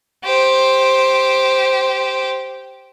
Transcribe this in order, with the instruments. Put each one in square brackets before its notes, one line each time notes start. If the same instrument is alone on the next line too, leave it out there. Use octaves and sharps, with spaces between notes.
[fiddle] G4 C5